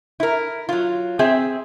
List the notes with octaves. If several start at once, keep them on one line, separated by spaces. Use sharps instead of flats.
E4 A#4
F#3 F4
C4 G#4 E5